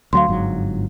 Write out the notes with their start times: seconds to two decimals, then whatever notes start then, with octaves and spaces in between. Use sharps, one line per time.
0.13 D2 F#3 F5 C6
0.28 G1 G#2 F#3